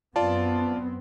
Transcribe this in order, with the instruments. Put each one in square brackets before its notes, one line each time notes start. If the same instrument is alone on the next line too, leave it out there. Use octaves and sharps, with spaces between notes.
[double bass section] F#2 B3 C4 [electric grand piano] F4 D5 A5